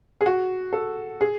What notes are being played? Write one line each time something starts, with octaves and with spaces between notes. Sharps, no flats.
G#4
F#4
A4
G#4